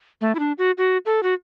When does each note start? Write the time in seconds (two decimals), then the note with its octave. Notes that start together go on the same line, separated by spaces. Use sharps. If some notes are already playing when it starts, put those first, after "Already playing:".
0.21 A3
0.35 E4
0.39 D4
0.58 F#4
0.78 F#4
1.06 A4
1.23 F#4